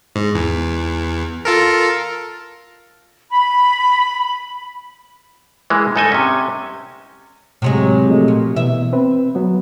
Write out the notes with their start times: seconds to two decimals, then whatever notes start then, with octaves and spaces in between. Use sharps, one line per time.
0.16 G#2
0.35 E2
1.45 F4 A4 A#4
3.31 B5
5.70 E3 G#3 A#3 E4
5.96 G#2 D#4 A4 D#5 G#5
6.12 C3 C#4
7.62 A2 C3 F#3 G#3
8.08 F3 A3 D#5
8.28 A#2
8.56 B2 E3 B3 E5
8.93 C4 B4
9.35 F#3 B3